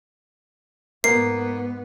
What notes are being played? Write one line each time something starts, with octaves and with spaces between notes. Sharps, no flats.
G#2 A#3 B3 C7